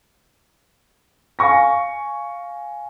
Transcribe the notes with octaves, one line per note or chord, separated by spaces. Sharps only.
F5 G#5 C#6 A#6